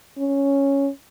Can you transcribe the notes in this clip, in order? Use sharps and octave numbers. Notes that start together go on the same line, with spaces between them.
C#4